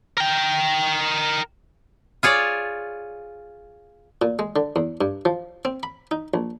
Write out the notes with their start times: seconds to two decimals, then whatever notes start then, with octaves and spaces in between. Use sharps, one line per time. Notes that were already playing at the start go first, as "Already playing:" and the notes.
0.18 A#4 G5
2.23 F4 G#4 C#5 D5
4.22 A#2
4.39 G#3
4.56 D3
4.76 E2
5.01 G2
5.25 F3
5.65 C4
5.83 B5
6.11 D#4
6.34 A#1